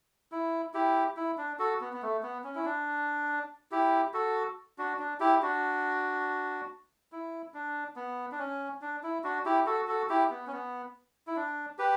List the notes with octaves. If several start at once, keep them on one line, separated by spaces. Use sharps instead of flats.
E4
E4 G4
E4
D4
F#4 A4
B3
B3
A3
B3
C#4
E4
D4
E4 G4
F#4 A4
D4 F#4
D4
E4 G4
D4 F#4
E4
D4
B3
D4
C#4
D4
E4
D4 F#4
E4 G4
F#4 A4
F#4 A4
E4 G4
B3
C#4
B3
E4
D4
G4 B4